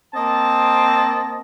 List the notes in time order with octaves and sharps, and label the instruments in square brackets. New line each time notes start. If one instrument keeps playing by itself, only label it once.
[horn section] A#3 C4 D#5 A5